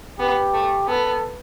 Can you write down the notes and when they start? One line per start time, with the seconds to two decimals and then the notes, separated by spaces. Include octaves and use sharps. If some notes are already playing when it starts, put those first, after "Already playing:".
0.19 B3 G4
0.53 A3
0.87 B3 A4